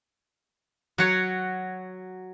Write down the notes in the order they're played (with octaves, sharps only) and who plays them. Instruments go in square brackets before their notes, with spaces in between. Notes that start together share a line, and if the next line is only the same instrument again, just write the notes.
[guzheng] F#3 F#4 C#5